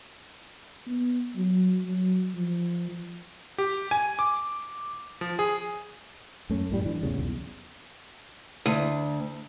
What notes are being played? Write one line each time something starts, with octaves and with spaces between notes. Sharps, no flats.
B3
F#3
F#3
F3
G4
G#5
D6
F3
G#4
F#2 A3 C#4
F#2 A2 G3
E3 D4
E2 A2 C#3 G3
B1 E2
D2